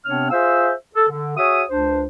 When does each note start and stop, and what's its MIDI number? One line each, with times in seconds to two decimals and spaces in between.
0.05 0.29 48
0.05 0.29 59
0.05 0.29 60
0.05 0.29 62
0.05 0.29 73
0.05 0.29 89
0.30 0.71 65
0.30 0.71 68
0.30 0.71 72
0.30 0.71 76
0.30 0.71 77
0.30 0.71 88
0.95 1.05 69
1.09 1.35 50
1.37 1.63 66
1.37 1.63 68
1.37 1.63 73
1.37 1.63 76
1.37 1.63 87
1.70 2.05 37
1.70 2.05 62
1.70 2.05 72